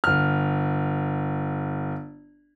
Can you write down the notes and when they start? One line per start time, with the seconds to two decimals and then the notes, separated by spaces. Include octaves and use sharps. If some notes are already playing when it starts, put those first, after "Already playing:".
0.04 G1 F6